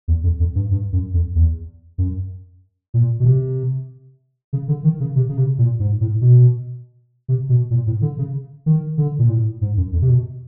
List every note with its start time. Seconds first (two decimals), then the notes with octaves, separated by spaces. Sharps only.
0.08 E2
0.24 F2
0.40 F2
0.55 G2
0.71 G2
0.93 F#2
1.14 F2
1.35 E2
1.98 F#2
2.94 A#2
3.20 B2
3.25 C3
4.53 C#3
4.68 D3
4.84 D#3
5.00 C#3
5.16 C3
5.29 C#3
5.37 C3
5.58 A#2
5.80 G#2
6.01 A2
6.21 B2
7.28 C3
7.49 B2
7.71 A#2
7.87 A2
8.02 D3
8.18 C#3
8.66 D#3
8.98 D3
9.19 A#2
9.29 A2
9.61 G#2
9.77 F#2
9.93 F2
10.02 C3
10.09 B2